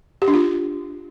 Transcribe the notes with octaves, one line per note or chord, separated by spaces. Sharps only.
G4
D4
F4